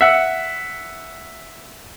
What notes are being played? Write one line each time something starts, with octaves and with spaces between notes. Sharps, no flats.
E5 F#5